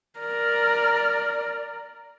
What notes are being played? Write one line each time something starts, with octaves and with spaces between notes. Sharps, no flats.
A#4 D5